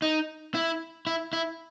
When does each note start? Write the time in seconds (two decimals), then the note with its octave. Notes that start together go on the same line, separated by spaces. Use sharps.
0.02 D#4
0.55 E4
1.07 E4
1.33 E4